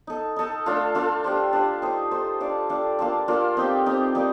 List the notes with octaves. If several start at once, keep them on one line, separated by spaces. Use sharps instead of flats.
D#4 A4 D#5
D#4 A4 D#5
A3 D4 F4 A4
A3 D4 F4 A4
D4 G4 C5
D4 G4 C5
D#4 A4 C5 D#5
D#4 A4 C5 D#5
D4 A4 D5 F5
D4 A4 D5 F5
A#3 D4 F4 A4
A#3 D4 F4 A4
C4 D#4 G4
C4 D#4 G4
G3 A#3 D#4